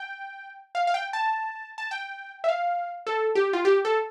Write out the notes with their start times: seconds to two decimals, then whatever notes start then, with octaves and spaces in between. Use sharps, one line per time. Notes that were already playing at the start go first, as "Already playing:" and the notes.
Already playing: G5
0.75 F5
0.87 F5
0.94 G5
1.13 A5
1.78 A5
1.91 G5
2.44 E5
2.49 F5
3.07 A4
3.35 G4
3.53 F4
3.65 G4
3.85 A4